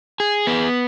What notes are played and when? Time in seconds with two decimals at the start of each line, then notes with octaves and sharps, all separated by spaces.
0.20 G#4
0.47 B3